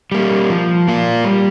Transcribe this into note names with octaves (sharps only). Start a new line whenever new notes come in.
G3 A#3
F3
A#3 F4
G3